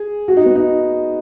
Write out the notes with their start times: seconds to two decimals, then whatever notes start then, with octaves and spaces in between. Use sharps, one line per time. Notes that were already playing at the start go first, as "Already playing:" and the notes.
Already playing: G#4
0.28 F#4
0.37 D#4
0.46 B3
0.56 D#4